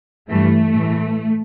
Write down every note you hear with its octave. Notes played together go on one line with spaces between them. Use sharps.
G2 E3 A3
A2 E3